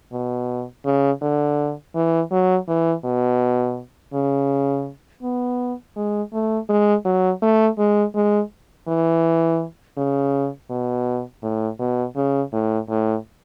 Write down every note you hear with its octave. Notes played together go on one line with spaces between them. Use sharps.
B2
C#3
D3
E3
F#3
E3
B2
C#3
B3
G#3
A3
G#3
F#3
A3
G#3
G#3
E3
C#3
B2
A2
B2
C#3
A2
A2